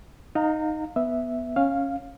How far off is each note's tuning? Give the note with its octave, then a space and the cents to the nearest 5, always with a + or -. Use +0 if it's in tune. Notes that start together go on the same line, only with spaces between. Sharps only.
D#4 +0 F5 +25 A#5 -30
B3 +0 E5 +0
C#4 -10 F5 +0